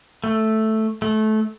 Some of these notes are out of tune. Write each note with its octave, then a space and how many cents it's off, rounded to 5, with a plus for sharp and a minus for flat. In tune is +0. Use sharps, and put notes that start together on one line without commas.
A3 +0
A3 -20